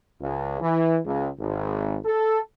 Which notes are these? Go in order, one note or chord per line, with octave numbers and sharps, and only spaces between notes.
C#2
E3
C#2
G#1
A4